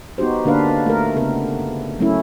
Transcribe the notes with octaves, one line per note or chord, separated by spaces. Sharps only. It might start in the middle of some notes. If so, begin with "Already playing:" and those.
B3 D#4 F#4 G4 C5
D3 A#3 D4 B4 F5
A3 A#4
C#3 B3 A#4
F#3 A3 C#4 E4